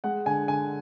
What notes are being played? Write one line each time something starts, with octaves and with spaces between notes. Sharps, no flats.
G#3 F#5
D3 G#5
D3 G#5